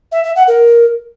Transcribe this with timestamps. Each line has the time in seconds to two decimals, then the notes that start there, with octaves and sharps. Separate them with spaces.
0.12 E5
0.24 E5
0.36 F#5
0.48 A#4